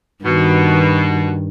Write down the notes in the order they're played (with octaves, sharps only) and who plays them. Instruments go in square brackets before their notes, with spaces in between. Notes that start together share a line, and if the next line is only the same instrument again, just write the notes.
[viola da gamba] G2 D#3 [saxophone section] B2